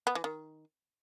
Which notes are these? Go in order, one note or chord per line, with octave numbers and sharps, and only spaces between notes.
B3
E3
D#3